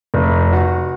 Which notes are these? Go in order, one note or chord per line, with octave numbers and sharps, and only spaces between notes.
F1
F#4